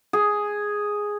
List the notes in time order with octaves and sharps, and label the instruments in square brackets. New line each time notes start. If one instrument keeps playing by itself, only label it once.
[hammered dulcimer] G#4